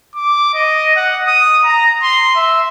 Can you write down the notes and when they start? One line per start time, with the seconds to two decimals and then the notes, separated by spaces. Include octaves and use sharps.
0.15 D6
0.54 D#5
0.96 F#5
1.27 D#6
1.64 A#5
2.02 C6
2.36 E5